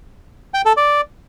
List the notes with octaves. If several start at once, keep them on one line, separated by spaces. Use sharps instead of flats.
G5
A4
D5